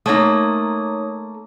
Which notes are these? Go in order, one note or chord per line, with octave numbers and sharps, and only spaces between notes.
A3 A#3 D#4 C#5 D#6